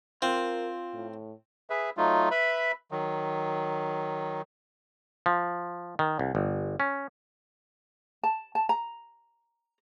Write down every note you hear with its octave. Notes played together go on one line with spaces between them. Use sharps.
C4 F4 A#4
A2
G#4 B4 E5
F#3 A3 D#4 F4
B4 E5 B5
D#3 F#3
F3
D#3
C2
G1
C#4
A5
A5
A#5